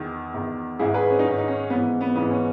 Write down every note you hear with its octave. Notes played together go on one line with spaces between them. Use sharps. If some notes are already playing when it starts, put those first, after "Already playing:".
Already playing: E2 D#3
E2 D#3
G#2 D#3 E4 G#4
G#4 B4
C#4
D#4
G#2 D#3 C#4
D#4
C#4
G#2 E3 B3
B3
G#2 E3 B3
C#4